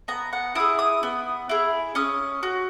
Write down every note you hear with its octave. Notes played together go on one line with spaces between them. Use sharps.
B3 A#5
F#5
E4 G#4 D#6
D#6
B3
E4 G#4
C#4 D#6
F#4